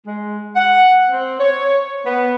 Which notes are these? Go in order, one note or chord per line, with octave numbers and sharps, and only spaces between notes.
G#3
F#5
C4
C#5
B3